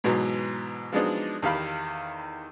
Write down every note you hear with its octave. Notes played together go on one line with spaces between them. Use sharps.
G#2 B2 E3 F#3
F3 F#3 G#3 B3 D4 D#4
E2 D#3 G4 F5 B5